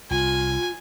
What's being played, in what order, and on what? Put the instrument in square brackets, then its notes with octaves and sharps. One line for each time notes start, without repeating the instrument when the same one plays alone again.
[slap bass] C2 [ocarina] F4 [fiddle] G#5